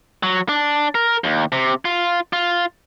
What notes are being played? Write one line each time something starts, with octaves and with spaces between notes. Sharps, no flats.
F#3
D4
A#4
D#2
C3
F4
F4